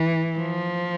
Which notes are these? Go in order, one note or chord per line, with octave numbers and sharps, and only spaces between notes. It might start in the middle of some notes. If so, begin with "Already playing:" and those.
Already playing: E3
F3